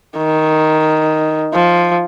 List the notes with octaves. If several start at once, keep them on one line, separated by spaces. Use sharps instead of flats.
D#3
F3